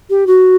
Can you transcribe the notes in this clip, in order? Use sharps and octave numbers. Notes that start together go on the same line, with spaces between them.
G4
F#4